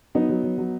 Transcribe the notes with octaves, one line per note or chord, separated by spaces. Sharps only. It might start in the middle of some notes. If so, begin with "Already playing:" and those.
F#3 B3 D#4
F#3
F#3
F#3